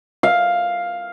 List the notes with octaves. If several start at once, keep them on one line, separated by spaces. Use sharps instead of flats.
F5